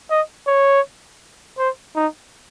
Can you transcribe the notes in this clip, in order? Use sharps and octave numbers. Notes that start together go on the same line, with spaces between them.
D#5
C#5
C5
D#4